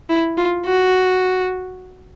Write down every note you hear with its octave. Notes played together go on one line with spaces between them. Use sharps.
E4
F4
F#4